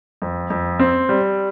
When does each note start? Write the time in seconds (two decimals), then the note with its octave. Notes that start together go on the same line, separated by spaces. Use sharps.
0.22 F2
0.50 F2
0.79 C4
1.09 G3